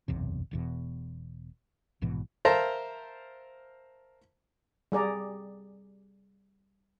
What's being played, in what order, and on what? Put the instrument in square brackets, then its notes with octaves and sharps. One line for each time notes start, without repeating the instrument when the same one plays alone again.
[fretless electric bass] F#1 B1 E2 C3
E1 E2 B2
A#1 G#2 B2 E3
[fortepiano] A#4 C5 E5 F5 A5 A#5
[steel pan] G3 G#4 D5 A#5